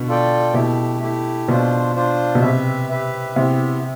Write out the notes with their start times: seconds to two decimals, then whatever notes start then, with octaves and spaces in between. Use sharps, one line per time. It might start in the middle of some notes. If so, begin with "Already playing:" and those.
Already playing: B2 D3
0.08 F4 A4 D5 G5
0.54 B2 A3 E4 G4
1.02 A3 E4 G4
1.48 B2 D4 F4 C5
1.96 D4 F4 C5
2.35 B2
2.42 C3 G4 B4 E5
2.89 G4 B4 E5
3.36 C3 B3 E4 G4